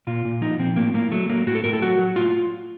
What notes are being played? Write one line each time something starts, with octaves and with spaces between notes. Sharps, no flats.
A#2 F4
A#2
F3 D#4
F3 C4
A2 A#3
A2 A#3
F#3 A3
F#3 A#3
A2 F#4
A4
A2 A#4
A4
F#3 F#4
F#3
A2 F4